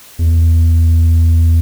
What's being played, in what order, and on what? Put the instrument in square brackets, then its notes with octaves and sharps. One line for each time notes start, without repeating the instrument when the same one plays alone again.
[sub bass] E2